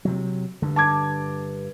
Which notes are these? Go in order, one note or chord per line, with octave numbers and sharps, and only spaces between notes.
C3 F#3
G2 D3
A5 D6 G#6